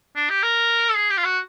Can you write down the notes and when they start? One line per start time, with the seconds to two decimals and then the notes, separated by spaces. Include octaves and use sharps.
0.16 D4
0.30 G4
0.43 A#4
0.89 A4
0.97 G#4
1.10 G4
1.18 F4
1.24 F#4